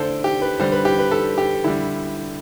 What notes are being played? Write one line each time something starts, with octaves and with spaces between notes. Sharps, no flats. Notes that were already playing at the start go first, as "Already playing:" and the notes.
Already playing: D3 A3 A4 C5 D5
G4
B4
D3 G3 C5
B4
G4
B4
A4
G4
D3 G3 E4